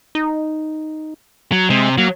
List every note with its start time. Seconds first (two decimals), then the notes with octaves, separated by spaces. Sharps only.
0.15 D#4
1.52 F#3
1.70 C3 G#3
1.98 F#3 A#3